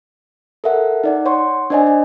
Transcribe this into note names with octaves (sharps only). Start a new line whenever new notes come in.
A4 A#4 E5 F#5
D#4 D5 F#5
C#5 F#5 C6 C#6
D4 C5 D5 D#5 G#5
G#5